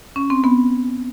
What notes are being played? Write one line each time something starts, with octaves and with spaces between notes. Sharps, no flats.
C#4
C4
B3